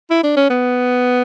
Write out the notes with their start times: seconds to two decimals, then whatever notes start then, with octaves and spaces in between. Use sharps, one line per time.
0.11 E4
0.23 D4
0.37 C#4
0.50 B3